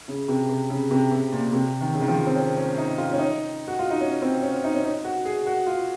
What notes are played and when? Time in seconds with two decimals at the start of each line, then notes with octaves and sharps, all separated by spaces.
0.08 C#3
0.28 C3
0.49 C3
0.70 C#3
0.91 C3
1.11 C3
1.32 A#2
1.53 C3
1.81 D#3
1.94 C#3
2.01 D#3
2.08 F3
2.27 C4
2.35 C#4
2.57 C#4
2.77 D#4
2.98 F4
3.13 C#4
3.18 D#4
3.68 F#4
3.79 F4
3.90 D#4
4.01 C#4
4.22 C4
4.42 C#4
4.64 D#4
4.74 C#4
4.84 D#4
5.05 F#4
5.25 G#4
5.47 F#4
5.66 F4